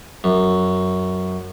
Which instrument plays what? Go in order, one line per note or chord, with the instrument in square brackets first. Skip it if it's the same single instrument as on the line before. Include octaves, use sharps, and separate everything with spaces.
[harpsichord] F#2